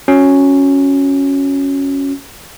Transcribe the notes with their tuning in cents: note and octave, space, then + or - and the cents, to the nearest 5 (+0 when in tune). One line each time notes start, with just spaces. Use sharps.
C#4 +0 F#4 -20